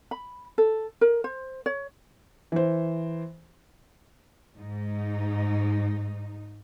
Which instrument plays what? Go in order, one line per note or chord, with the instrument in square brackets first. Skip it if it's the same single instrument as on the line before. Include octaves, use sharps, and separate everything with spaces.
[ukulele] B5
A4
A#4
C5
C#5
[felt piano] E3 C5
[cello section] G#2 D#4